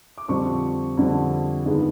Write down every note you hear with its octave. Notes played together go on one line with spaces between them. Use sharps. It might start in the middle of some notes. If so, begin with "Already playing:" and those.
D6
F2 D3 G3 C4 C#6
F2 D3 G3 C4
G2 D#3 G#3 B3